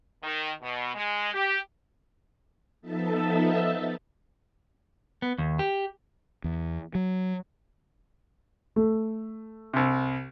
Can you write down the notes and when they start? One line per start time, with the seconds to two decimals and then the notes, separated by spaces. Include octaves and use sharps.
0.24 D#3
0.63 B2
0.95 G#3
1.34 G4
2.81 F3 B3 D#4 A4 E5 A5
5.22 B3
5.38 D#2
5.59 G4
6.44 E2
6.95 F#3
8.76 A3
9.74 C2 C3